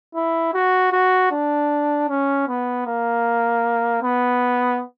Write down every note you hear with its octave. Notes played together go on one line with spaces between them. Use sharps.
E4
F#4
F#4
D4
C#4
B3
A#3
B3